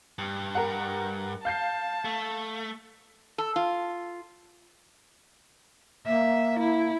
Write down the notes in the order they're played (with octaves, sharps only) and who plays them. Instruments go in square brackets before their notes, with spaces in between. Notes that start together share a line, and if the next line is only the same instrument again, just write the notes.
[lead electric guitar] G2
[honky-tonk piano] A#4 F#5
[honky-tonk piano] F5 G6 C7 [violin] A5
[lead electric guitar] A3
[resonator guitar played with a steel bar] A4
F4
[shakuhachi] A#3 [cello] E5
[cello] E4